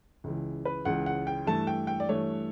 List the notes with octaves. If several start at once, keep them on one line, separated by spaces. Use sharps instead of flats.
C#2 C#3 E3
B4
C#2 C#3 E3 F#5
F#5
G5
G2 E3 A3 A5
G5
G5
D5
G2 E3 A3 C#5